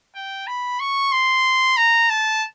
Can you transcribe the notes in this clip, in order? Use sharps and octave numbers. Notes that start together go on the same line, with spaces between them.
G5
B5
C#6
C6
A#5
A5